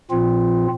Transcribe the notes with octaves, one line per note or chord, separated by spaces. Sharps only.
A#2 F3 C4 F4